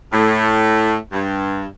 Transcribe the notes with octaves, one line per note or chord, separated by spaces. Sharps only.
A2
G2